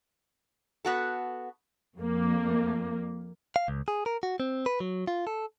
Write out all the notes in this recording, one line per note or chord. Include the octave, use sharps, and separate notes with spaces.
B3 F#4 A4
F2 A#3
F5
C#2
G#4
A#4
F#4
C4
B4
F#3
F4
A4